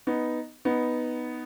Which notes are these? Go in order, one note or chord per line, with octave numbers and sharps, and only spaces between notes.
B3 D#4
B3 D#4